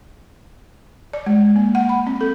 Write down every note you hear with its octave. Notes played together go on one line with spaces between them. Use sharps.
D5
G#3
A#3
F#5
B5
C4
A4